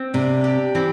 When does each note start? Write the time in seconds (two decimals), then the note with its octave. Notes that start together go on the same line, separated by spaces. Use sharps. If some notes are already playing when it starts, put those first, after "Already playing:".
Already playing: C4
0.14 C3 D4
0.44 G4
0.75 E3 C4